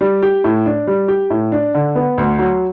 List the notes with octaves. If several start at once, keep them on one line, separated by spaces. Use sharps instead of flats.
G3
G4
A2
D4
G3
G4
A2
D4
D3
B3
D2
F#3